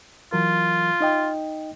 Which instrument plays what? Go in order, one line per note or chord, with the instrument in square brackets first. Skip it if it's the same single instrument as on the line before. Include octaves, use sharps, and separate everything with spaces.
[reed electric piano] E3 F#3 A#4 [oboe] F4
[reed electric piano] D#4 D#5 G5